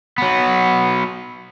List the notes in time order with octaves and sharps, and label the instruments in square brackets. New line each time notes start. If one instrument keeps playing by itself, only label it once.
[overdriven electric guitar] F#3 B3